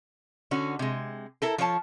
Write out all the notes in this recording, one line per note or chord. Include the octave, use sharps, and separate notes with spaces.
D3 C#4 F#4
C3 G#3
E4 A4 A#4
F3 F4 C#5 A5